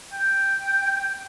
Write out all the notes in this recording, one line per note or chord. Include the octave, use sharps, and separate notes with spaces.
G5